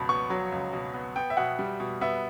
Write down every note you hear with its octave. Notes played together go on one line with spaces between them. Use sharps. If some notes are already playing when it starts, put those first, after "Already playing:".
Already playing: C#2 B2 A5 B5
B3 C#6
F#3
C#2
B2
B3
B3 G5
E5
B2 F#5
G3
B2
B3 E5